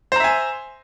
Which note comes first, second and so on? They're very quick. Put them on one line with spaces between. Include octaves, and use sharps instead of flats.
C5 A#5 E5 G#5